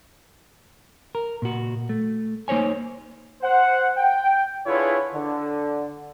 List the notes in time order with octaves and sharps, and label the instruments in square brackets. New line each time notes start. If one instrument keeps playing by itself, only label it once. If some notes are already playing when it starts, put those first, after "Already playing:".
[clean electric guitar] A#4
A#2 F#4
A3
A#3 D#4 C5 C#5 G#5
[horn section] C5 F#5
G5
D3 E4 F4 G#4 B4 C#5
D3